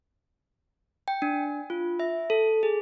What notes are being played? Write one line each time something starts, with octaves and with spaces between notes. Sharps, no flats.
G5
D4
F4
E5
A4
G#4